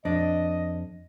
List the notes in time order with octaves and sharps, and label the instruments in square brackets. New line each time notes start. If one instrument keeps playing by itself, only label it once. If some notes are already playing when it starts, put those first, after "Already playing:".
[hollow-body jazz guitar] F2 D4 [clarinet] D#5